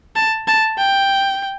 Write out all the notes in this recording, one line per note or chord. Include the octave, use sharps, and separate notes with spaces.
A5
A5
G5